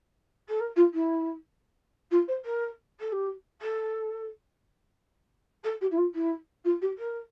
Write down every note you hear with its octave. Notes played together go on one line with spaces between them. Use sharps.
A4
A#4
F4
E4
F4
C5
A#4
A4
G4
A4
A4
G4
E4
F4
E4
F4
G4
A#4